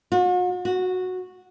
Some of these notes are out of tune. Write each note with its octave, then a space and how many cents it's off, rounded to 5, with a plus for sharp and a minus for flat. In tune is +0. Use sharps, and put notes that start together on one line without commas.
F#4 -45
F#4 -10